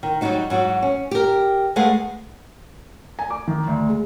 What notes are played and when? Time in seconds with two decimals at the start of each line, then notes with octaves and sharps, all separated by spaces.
0.03 D#3
0.21 F#3 G3 D4 D#4 F#4
0.50 G#2 F#3 F#4
0.82 C#4
1.11 G4 A#4
1.76 G#3 A3 G#4 B4 F5 F#5
3.19 G#5
3.30 D6
3.47 D#3
3.67 D2
3.89 G#3